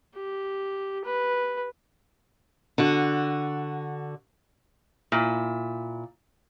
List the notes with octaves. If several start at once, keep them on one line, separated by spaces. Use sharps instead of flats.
G4
B4
D3 F#4
A#2 E4